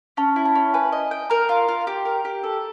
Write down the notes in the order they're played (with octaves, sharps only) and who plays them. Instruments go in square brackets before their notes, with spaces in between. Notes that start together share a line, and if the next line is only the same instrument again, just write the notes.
[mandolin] C#4 [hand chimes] A5
[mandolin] E4
[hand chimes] A5
[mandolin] C#4
[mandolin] B4 [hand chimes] G#5
[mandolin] D#5
G5
[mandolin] A#4 [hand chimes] A#5
[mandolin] F4
F4
G4
A#4
G4
A4